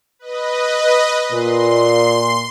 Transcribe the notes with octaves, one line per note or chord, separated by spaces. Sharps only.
B4 D#5
A#2 C6